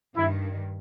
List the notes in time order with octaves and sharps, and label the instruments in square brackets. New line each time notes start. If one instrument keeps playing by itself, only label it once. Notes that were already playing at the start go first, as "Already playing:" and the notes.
[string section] G2 D#3 [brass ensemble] E4